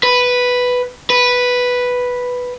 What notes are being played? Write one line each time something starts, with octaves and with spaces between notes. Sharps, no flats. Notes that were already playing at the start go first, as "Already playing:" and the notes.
B4
B4